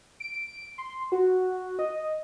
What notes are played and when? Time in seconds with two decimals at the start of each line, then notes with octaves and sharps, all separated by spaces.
0.20 D7
0.78 C6
1.12 F#4
1.79 D#5